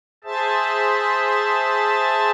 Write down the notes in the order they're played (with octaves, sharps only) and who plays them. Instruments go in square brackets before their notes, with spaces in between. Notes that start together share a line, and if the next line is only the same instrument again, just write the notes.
[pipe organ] G#4 C5 E5 A5